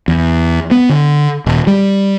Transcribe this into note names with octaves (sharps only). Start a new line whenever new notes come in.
E2
B3
D3
D#1
G3